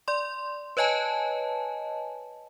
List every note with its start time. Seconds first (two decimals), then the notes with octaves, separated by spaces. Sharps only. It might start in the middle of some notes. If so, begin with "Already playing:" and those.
0.08 D5 C6
0.77 B4 C#5 D#5 G#5 A5